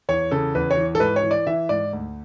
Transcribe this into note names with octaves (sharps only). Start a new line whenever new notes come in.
E2 C#5
C#3 A4
E2 B4
C#5
E3
A4
G#2 B4
C#5
E3
D5
E3 E5
G#2 D5
D2